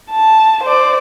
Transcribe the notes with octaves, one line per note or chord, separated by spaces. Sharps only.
A5
C5 D5